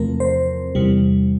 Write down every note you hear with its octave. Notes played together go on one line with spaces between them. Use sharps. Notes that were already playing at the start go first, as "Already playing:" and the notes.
Already playing: E2 C3 F3 A3 C4 A#4
C5
E2 C3 G3